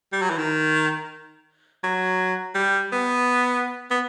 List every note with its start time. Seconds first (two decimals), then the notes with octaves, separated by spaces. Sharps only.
0.13 G3
0.22 F#3
0.30 E3
0.38 D#3
1.83 F#3
2.55 G3
2.92 B3
3.91 B3